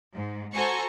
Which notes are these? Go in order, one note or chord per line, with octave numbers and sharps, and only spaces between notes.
G#2
F#4 A4 C5 G#5 A#5 C#6